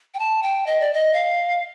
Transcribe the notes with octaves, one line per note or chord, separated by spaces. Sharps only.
G5
A5
G5
D#5
D5
D#5
F5